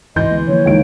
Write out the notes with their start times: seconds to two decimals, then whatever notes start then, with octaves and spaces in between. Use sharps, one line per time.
0.16 E1 C2 G#2 E3 D#5 C6 G6
0.31 D2 G#3 B3
0.48 D3 F3 A#3 C#5
0.66 C#2 D#3 D7